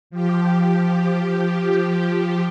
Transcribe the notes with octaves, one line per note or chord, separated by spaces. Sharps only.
F3 G4